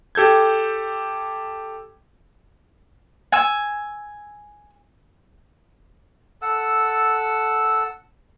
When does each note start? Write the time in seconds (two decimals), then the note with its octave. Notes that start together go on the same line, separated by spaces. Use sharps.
0.15 G4 A4 G6 G#6
3.32 G#5 E6
6.42 A4 F#5 E6